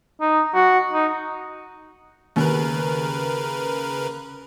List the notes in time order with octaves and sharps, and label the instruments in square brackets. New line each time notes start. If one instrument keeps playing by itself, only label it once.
[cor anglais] D#4
F#4
D#4
[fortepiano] D#2 [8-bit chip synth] C#3 A#4 B4